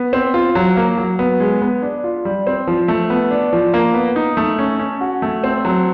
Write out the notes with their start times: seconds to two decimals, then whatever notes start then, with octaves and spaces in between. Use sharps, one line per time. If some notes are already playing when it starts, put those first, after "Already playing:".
Already playing: B3
0.13 C4
0.34 F4
0.55 F#3
0.77 A#3
0.98 F#3
1.19 B3
1.40 G#3
1.62 B3
1.82 D4
2.04 F4
2.25 G3
2.47 C4
2.67 F3
2.88 A3
3.10 B3
3.31 D4
3.53 F3
3.74 A#3
3.94 B3
4.16 D#4
4.37 A3
4.58 C#4
4.79 C#4
5.01 F#4
5.22 A3
5.44 C4
5.65 F#3